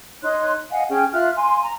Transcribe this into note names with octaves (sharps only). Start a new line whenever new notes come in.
D#4 C#5 C6 F#6
D#5 F5 F#5 G#5
C#4 G#4 G5 F6
F4 E5 F6 F#6
F5 G#5 C6
A#5